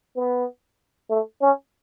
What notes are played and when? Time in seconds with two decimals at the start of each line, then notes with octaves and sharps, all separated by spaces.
0.16 B3
1.10 A3
1.41 C#4